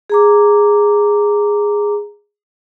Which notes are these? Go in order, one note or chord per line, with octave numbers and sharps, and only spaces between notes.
G#4 A#5 D6